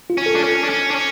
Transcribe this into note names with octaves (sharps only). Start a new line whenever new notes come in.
F4
C#4
A4
D4
C#4 A4
D4
C#4
D4
C#4